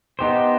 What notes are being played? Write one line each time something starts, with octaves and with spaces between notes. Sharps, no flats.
B3 D#4 G4 C5